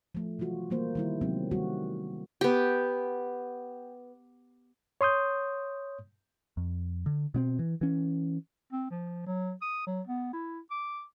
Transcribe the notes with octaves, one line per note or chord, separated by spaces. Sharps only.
F3 A3
C3 E3 F#3 F4 F#4
E3 G3 A#3 C5
D#3 G3 E4
C3 F#3 G#3 B3 C4
D#3 G3 A3 A#3 C4 F#4
B3 G4
C#5 C6 D#6 G6
F2
D3
B2 B3 C4
E3
E3 C#4
C4
F3
F#3
D#6
F#3
B3
E4
D6